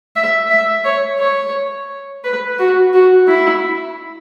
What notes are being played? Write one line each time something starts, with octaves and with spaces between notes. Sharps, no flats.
E5
E5
C#5
C#5
B4
F#4
F#4
E4